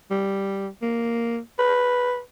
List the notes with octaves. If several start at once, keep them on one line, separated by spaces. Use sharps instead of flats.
G3
A#3
B4